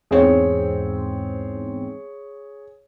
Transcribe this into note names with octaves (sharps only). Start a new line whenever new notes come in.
E2 G#2 C4 G#4 C#5